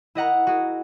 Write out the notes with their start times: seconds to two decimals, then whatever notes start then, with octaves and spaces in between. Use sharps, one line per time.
0.15 E4 D#5 F#5 A#5
0.47 F#4 G#4